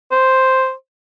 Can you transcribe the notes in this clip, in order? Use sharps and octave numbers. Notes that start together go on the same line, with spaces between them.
C5